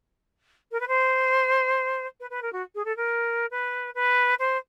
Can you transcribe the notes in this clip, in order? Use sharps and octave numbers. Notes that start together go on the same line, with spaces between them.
A#4
B4
C5
B4
B4
A#4
F#4
G#4
A4
A#4
B4
B4
C5